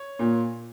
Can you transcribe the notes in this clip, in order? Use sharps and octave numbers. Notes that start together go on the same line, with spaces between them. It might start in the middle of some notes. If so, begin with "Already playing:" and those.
Already playing: C#5
A#2